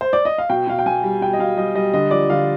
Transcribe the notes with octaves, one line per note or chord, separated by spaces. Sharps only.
C5
D5
D#5
F5
B2 G5
B2 F5
G5
B2 G#5
G3
B2 G5
D#5
B2 F5
G3 D#5
G3 D#5
D3 D#5
F3 D5
D3 F5